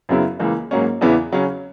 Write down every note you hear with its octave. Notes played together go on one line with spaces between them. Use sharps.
F#2 C#3 F#3 B3 E4
C#2 C#3 E3 A#3
G#2 F#3 A#3 C#4
E2 C#3 E3 B3 E4
C#3 F#3 C#4